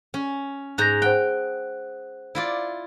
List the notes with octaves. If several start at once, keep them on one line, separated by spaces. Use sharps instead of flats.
C#4
G#2 A#5 F#6 G6 A#6
C5 F#5 G5 F#6
E4 F4 D5